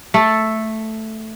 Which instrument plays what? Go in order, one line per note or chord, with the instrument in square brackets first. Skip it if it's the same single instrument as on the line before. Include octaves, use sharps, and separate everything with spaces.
[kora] A3 A4